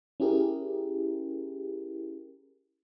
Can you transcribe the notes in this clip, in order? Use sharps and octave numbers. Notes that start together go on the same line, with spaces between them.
C#4 E4 G4 G#4 A#4